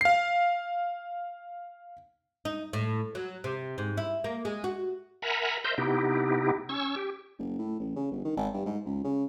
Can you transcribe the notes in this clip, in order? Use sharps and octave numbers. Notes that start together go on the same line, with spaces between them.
F5 C7
D#4
A2
F#3
C3
G#2
E4
A#3
G#3
F#4
A#4 E5 F#5 G#5 A#5 B5
A#4 C5 D#5 E5 C6 G6
C3 B3 D#4 E4 G4
C#4 C#6 E6
G4
F#1
A2
A1
C#3
G1
D#3
G#1
G2
G#2
C#2
C#3